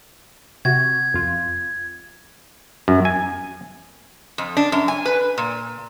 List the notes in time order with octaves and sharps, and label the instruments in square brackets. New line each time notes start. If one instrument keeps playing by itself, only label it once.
[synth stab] C3 F#4 [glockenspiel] G#6
[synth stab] F2 F4
[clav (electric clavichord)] F#2
G#5
[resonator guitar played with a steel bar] F2
D4
F#2
G#5
B4
A#2